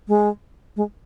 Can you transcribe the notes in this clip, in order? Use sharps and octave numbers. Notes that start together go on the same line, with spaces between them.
G#3
G#3